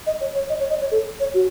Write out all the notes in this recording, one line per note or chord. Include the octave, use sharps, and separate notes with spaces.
D#5
C#5
C#5
D#5
C#5
D#5
C#5
A4
C#5
F#4